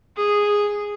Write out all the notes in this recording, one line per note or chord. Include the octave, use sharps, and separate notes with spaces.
G#4